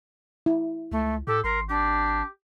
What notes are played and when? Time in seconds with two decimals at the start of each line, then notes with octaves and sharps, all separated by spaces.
0.46 E4
0.92 C#2 A3
1.27 A2 G4 A4
1.44 G#1 A#4 C6
1.69 D4 G4